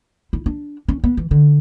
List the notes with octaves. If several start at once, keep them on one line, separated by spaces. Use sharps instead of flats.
E4
D4
C#4
B3
E3
D3